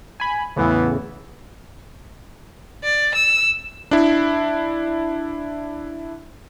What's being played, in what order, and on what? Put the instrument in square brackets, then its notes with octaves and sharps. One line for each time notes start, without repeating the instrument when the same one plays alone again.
[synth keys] G#5 B5
[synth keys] E2 A2 C#3 [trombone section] E3 B3
[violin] D5
E6
[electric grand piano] D4 E4